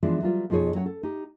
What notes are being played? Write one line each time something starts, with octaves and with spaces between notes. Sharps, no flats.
E3 F3 G#3 B3 D4
F#3 G3 F4 B4
F2 B2 F3 D#4 G#4 C#5
F#3 C#4 C#5 F#5
A4
D#4 G4